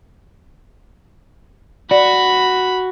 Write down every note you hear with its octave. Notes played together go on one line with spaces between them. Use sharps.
F#4 D5 B5